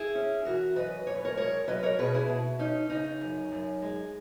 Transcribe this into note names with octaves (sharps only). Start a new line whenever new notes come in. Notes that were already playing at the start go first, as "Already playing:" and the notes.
Already playing: E4 G#4
C#4
E3 F#4 A#4
F#2 B4 D#5
F#2 C#5
B4
A#4 C#5
G#3 A#4 C#5
F#3 B4 D#5
A#4 C#5
B2 G#4 B4
E4 G#4
B2
C#4 D#4
C#3 D#4
F#2
F#2
G#3